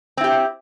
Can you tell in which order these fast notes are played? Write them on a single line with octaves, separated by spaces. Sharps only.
C4 E4 G4